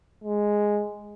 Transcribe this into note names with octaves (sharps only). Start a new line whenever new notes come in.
G#3